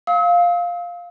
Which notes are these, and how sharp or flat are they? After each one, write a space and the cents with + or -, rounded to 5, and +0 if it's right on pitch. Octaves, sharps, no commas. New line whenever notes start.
F5 +5 E6 -45